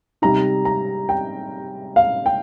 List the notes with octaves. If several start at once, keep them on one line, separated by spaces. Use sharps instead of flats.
C3 G3 D#4 A#5
A#5
G5
F5
G5